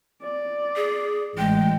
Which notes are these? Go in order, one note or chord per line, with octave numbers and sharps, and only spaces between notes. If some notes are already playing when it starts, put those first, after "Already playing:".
D5
G#4
A1 G#3 G5